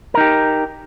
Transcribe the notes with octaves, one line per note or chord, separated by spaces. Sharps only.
D#4 G4 A#4